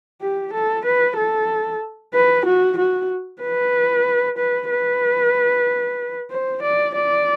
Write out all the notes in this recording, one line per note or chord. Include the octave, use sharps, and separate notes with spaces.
G4
A4
B4
A4
B4
F#4
F#4
B4
B4
B4
C5
D5
D5